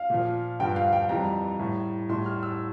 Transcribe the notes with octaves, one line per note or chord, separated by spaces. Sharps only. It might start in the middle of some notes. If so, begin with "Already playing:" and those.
Already playing: F5
A#2 F3
G2 D3 F3 G5
F5
G5
F2 E3 G3 A#5
A2 G3
A2 G3 C6
F6
E6